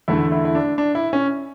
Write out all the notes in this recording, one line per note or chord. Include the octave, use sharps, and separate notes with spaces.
E2 D3 A3 E4
E4
E4
D4
D4
E4
C#4